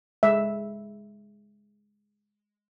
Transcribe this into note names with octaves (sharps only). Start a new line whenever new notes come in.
G#3 E5